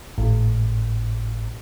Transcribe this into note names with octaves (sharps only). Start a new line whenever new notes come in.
G#1 A2